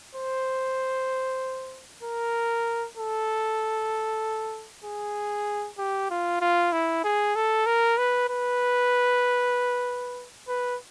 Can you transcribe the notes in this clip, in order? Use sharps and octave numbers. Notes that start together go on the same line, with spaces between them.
C5
A#4
A4
G#4
G4
F4
F4
E4
G#4
A4
A#4
B4
B4
B4